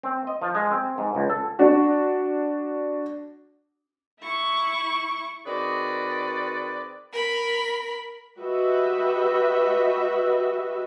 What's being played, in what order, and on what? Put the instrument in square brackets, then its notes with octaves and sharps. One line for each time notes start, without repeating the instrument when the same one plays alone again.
[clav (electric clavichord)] C4
D#5
F3
G#3
C4
G#2
C#2
A4
[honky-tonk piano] D4 F#4
[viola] E4 C#6
[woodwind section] D#3 C4 F#4 G#4 B4 D5
[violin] A#4 B5
[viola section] F#4 G4 B4 D#5 E5